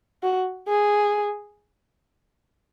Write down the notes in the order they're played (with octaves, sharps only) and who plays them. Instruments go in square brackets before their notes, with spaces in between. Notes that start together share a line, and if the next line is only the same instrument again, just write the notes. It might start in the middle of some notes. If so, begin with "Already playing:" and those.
[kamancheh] F#4
G#4